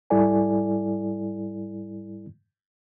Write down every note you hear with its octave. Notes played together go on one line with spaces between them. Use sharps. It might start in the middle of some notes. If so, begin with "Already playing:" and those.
G#2 G3 E4 A4 D5 G#5